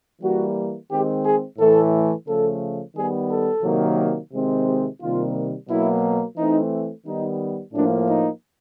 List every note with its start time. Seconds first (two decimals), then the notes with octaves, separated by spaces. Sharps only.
0.22 E3 G3 A#3 F#4
0.90 D#3 G#3 C4 G4
1.24 G#4
1.58 A2 E3 A3 A4
2.27 C#3 F3 A3 A4
2.95 D#3 G3 B3 G#4
3.30 A4
3.63 C3 D#3 F#3 A#3
4.33 C3 D#3 G#3 C4
4.67 G4
5.01 C3 D#3 G3 A#3 F4
5.68 B2 F#3 A#3 E4
6.37 E3 A3 C4 D#4
7.05 D#3 G3 B3 D#4
7.73 A2 F3 A#3 D4
8.08 D#4